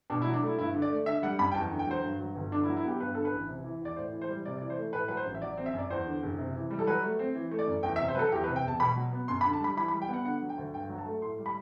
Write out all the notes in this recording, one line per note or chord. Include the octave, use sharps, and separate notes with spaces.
B2 D4
E4
F#3
D4
A3 E4
G2 E4
D3
D5
A3
D3 E5
G3 F#5
F#2 B5
G5
E2 A5
D3
G5
F#3 C5
G2
F#3
G1
D3 D4
E4
F#3
E4
B3 G4
G2 B4
D3 A4
B4
A1
C3
E3
E2 D5
A2 C5
E3
C5
G3
C3 D5
E3 D5
C5
A3
A2 B4
F#3 B4
C5
A1
E5
F#3 D5
C4
E5
F#2 D5
E2 C5
D3
F#1
C3
E3
G3
A4
F#3 B4
A3
C4
E3
A3
D5
F#2
E2 G5
E5
C3
C5
F#3 A4 B4
E2 G4
B4
C3
G5
E1 A5
B2 B5
F#3
B3
F#2 C6
B5
D3
A5
G3 B5
E3 B5
B5
G3
G5
B3
F#5
D3 F#5
F#3
G5
D2
G2 G5
F#3
A5
A3
A2 C6
G3
B5